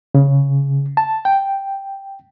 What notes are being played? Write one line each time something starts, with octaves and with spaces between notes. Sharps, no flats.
C#3
A5
G5